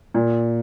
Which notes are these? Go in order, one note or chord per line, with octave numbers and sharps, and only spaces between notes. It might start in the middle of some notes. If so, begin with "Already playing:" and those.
A#2